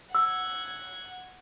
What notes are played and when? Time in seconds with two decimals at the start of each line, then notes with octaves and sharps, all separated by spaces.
0.15 F#5 E6 G#6